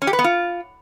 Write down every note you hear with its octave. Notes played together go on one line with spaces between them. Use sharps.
C#4
G4
B4
B3
F4